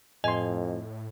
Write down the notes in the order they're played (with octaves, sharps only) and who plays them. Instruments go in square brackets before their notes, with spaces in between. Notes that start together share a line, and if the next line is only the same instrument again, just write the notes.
[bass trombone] F2 [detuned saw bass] A2 [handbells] D#5 [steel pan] G#5 C6